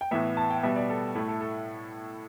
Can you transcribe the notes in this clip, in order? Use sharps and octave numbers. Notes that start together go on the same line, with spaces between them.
G5
A2 E3 B3 E5
A5
G5
B2 G3 B3 E5
D5
A4
A2 A3 E4
A4
A4